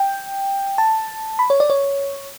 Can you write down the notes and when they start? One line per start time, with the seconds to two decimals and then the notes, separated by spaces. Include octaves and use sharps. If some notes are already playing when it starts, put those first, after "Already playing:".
Already playing: G5
0.78 A5
1.39 B5
1.50 C#5
1.60 D5
1.70 C#5